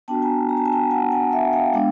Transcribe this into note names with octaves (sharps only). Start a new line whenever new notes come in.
B3 D4 F#4 G5 A5
G#5 A#5
A#5
A5
G#5
G5 A5
F#5 G#5
F#5 G#5
E5 F#5
F5 G5
G#3 B3 D4 F5 G5